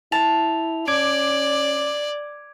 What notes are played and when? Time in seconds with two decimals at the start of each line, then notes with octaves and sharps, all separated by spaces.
0.12 E4 A5 F7
0.88 C#4 D5 D6 G#6 D7